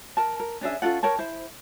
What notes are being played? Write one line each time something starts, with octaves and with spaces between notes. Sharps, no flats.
A#4 A5
A#4
C#4 D4 G#4 E5
C#4 F4 A4 F#5
A#4 C#5 G5 A5
E4 C5